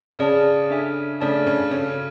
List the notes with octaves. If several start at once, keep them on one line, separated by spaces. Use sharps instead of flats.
C#3 C#4 G#4 D5 A5
D4 A4 E5 G#5
C#3 A3 C#4 D4 A4 D5 A5
C#3 C#4
C#3 C#4 F#4 A4 E5 G#5